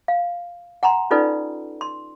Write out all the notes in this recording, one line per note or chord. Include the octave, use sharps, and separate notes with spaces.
F5
F#5 G#5 A#5 C6
C#4 D#4 F4 A4 B4 D5
C6